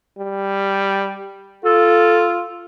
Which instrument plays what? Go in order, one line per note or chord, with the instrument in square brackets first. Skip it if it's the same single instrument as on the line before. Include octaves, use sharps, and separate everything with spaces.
[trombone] G3
[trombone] F4 [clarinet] A4